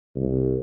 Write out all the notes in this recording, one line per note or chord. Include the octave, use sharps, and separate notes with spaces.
C2